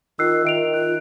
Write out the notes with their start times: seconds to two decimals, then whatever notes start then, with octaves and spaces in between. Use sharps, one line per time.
0.19 D#3 F4 E6 F#6 C7
0.45 D#3 E5 D7 F7
0.74 F4 F#6